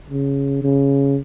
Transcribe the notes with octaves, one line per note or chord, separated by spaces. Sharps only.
C#3
C#3